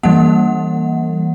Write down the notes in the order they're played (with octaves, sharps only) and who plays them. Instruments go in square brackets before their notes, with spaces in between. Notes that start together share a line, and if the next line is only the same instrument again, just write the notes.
[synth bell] E3 G3 A#3 F#5